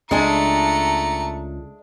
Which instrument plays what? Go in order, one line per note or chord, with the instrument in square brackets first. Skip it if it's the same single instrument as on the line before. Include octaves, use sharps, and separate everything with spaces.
[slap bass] C#2 [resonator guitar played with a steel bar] G#3 D4 G#5 [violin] A3 C#7 [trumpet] A#5